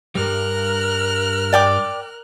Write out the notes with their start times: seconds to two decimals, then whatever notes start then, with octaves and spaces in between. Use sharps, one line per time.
0.15 G2 G3 A#4 F6 F#6
1.52 D5 G5 D6